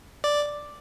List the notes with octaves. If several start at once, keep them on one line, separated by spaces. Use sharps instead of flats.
D5